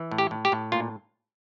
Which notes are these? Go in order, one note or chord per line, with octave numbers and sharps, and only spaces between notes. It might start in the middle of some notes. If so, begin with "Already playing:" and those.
Already playing: E3
A2
G4
A2
G4
A2
A#2 F4